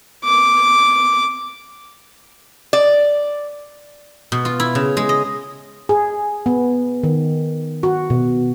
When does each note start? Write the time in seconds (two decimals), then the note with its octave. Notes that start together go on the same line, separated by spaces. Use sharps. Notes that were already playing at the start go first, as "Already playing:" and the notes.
0.24 D6
2.73 D5
4.32 B2
4.45 F4
4.60 E4
4.75 C#3
4.97 G#3
5.09 D#5
5.89 G#4
6.46 B3
7.03 D#3
7.83 F#4
8.10 B2